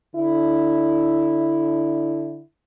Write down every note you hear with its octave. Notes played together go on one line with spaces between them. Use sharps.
D3 E4